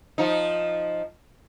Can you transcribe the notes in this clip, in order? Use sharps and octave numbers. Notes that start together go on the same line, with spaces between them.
F3 D#4